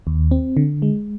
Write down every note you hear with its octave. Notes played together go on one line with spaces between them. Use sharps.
D#2
C4
D3
G#3